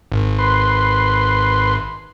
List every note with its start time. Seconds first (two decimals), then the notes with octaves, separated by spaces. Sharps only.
0.12 G#1
0.39 B4 C6